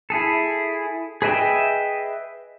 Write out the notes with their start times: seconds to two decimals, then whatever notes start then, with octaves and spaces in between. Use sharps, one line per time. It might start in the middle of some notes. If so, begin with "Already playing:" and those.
0.10 E4 G#4 A4
1.22 G#4 B4 D#5 E5 G5